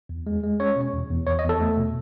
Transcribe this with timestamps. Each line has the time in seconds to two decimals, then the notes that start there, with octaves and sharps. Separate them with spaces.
0.09 E2
0.27 G#3
0.43 G#3
0.60 C#4 C#5
0.76 B2
0.94 E2
1.10 E2
1.27 E2 C#5
1.39 D#5
1.44 E2
1.49 A4
1.60 A3
1.78 B2